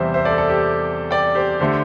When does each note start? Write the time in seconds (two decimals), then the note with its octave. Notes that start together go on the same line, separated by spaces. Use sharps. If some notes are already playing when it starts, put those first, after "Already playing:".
Already playing: E2 C3 G3 C4 C5 E5
0.14 C5 E5
0.25 A4 D5
0.38 A4
0.50 G4
1.11 D5 G5
1.35 G4 C5
1.60 D3 A3 G4 C5